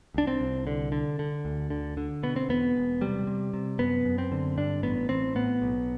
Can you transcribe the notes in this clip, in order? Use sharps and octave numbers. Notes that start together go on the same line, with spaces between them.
C2 D4
C4
C2
D3
D3
D3
D2
D3
D3
B2 B3
C4
E2 B3
E1
C3 G3
C3
C3
F#2 B3
F#2
C4
D3
G2 D4
A1 B3
A1 C4
A2 B3
B1